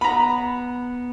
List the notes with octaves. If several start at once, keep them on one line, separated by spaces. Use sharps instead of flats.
B3 A#5 B5